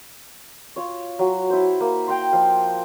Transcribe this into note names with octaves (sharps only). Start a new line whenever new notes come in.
F4 C#5
F#3
E4 C5
A#3
G5 A#5 C6
F3 F5